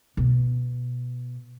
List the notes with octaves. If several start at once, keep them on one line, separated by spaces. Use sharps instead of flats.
B2